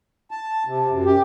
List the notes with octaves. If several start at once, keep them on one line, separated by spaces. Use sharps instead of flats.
A5
C3
F#2
G4